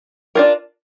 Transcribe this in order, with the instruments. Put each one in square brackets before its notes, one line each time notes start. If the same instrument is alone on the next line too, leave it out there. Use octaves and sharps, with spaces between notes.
[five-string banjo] D4 F4 A#4